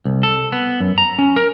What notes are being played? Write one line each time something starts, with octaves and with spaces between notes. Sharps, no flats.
C2
A4
B3
F#2
A#5
C#4
A#4